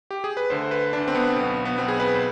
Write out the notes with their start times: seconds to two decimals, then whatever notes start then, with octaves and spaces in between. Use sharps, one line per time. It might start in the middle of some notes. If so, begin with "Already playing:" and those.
0.11 G4
0.24 G#4
0.37 B4
0.50 D2 D3 C5
0.71 B4
0.93 D2 D3 D4
1.08 C4
1.15 B3
1.36 B1 B2
1.65 B3
1.78 B1 B2 C4
1.88 G#4
2.00 B4
2.15 C5